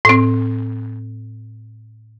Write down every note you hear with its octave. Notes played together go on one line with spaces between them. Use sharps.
A2 C4